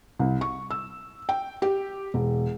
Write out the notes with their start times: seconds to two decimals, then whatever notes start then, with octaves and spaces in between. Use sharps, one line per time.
0.19 C2
0.41 C#6
0.71 E6
1.29 G5
1.62 G4
2.14 E1